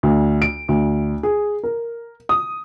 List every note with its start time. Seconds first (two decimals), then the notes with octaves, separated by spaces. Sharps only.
0.03 D2
0.42 D7
0.69 D2
1.23 G#4
1.64 A#4
2.29 D#6